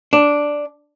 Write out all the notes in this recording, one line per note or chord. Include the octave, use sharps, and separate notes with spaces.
D4